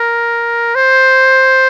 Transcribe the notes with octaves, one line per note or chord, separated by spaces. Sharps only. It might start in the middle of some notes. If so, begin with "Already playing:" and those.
Already playing: A#4
C5